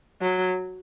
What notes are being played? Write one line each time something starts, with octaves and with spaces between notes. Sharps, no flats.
F#3